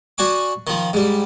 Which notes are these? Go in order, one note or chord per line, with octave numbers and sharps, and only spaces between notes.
D4 F#4 G#5 D6
D#3 F3
G#2 G3